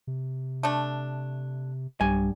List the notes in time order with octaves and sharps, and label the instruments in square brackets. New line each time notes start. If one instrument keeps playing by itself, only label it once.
[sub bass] C3
[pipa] A3 D4
[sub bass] B1 [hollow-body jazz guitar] G2 G#5